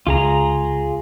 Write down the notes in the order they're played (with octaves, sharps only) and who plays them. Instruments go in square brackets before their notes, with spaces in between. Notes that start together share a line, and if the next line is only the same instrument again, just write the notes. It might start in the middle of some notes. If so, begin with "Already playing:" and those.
[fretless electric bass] C#2 [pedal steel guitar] F4 G#4 A#5